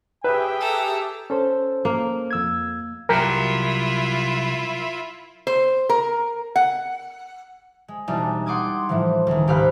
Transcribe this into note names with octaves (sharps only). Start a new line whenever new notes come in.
G4 G#4 B4 E5 G5
A4 A#5
C#4 A4 C5
A#3
F2 E6 G#6
C2 F#3 E4 F4 G4 A#4
C5
A#4
F#5
G#3
E1 G3 D4 D#4
F#5 G5 C6 D6 D#6 G#6
A2 E3 F3
C#2 D#3
G#1 G4 C5 F5 B5 F#6